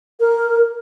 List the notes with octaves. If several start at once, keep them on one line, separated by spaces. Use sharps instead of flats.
A#4